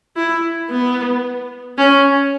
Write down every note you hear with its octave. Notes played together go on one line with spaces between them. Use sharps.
E4
B3
C#4